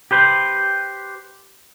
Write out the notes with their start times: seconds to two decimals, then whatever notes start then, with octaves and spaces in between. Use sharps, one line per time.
0.11 G4 B4 C5